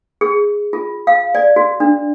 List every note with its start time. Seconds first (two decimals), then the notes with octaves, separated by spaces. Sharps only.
0.21 G#4
0.73 F4
1.07 F5
1.35 D5
1.56 F#4
1.80 D4